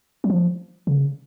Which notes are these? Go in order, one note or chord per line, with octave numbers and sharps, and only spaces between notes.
F#3
F3
C#3